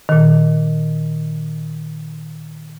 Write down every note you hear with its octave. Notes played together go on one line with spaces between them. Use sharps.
A#2 D#3